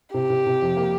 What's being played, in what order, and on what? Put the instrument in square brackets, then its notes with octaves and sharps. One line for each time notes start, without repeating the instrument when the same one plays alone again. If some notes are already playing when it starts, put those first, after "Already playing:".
[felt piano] C3 [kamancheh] G4
[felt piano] C3
C3
F2
A#3